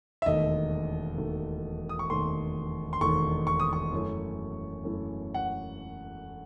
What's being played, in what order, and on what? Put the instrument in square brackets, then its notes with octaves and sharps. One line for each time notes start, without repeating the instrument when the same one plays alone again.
[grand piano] E5
E1 D#2 D#3 A3 D#5
E1 D#2 D#3 A3
D#6
C#6
E1 D#2 D#3 A3 C6
C6
E1 D#2 D#3 A3 C#6
C#6
D#6
C#6
F#2 E3 A3 C#4
F#2 E3 A3 C#4
F#5